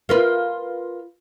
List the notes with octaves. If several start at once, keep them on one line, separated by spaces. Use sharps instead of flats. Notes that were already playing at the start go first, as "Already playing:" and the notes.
F4 A#4 B4